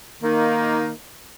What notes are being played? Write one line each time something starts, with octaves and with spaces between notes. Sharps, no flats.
D#3 A#3 D#4